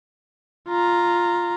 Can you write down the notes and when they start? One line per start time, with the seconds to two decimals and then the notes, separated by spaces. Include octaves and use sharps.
0.68 F4 A#5